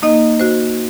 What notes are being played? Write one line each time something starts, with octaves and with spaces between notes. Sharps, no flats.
A#3 D#4 D#5
F#4 C5